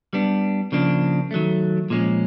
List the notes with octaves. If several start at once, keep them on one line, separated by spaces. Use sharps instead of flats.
G3 B3 D4
C#3 F3 A#3 D4
D#3 F#3 A3
A#2 F3 G#3 C#4